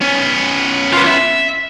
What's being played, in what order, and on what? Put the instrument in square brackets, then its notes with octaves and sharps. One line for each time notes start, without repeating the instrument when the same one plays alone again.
[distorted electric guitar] B3 C#4
[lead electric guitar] F4 B4
E5